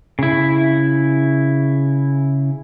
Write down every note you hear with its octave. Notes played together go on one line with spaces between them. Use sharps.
C#3 E4